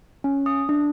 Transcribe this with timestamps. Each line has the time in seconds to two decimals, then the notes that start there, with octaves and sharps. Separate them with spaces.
0.24 C#4
0.46 D#6
0.69 D4